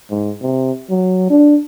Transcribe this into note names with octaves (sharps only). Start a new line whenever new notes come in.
G#2
C3
F#3
D4